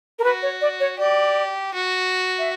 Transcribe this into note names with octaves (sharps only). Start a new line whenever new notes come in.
A#4
F#4 B4
C#5
D5
C#5
G4 D5
F#4
E5